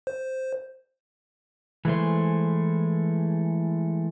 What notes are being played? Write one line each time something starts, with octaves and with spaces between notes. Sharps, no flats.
C5
E3 G#3 A3 C5